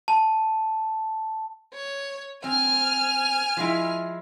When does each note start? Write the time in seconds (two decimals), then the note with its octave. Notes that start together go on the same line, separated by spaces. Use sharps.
0.08 A5
1.74 C#5
2.44 C4 G#5 F6
3.57 F3 G#3 E4